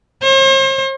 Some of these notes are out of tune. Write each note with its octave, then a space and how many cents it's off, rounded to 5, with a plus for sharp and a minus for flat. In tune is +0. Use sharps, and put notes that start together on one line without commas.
C5 +45